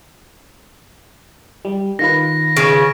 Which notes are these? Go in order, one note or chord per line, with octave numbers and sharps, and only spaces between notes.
G3
D#3 F4 B4 A#6
C#3 D7